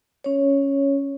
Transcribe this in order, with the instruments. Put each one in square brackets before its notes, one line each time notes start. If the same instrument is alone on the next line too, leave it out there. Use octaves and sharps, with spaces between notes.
[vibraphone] C#4 C#5